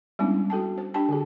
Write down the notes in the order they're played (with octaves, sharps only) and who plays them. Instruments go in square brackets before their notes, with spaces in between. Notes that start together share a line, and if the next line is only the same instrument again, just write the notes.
[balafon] G3 G#3 B3 C#4 D4 E4
F#4 A4 G5 A5
C5
D4 G4 G5 A5
D3 F#4 G#4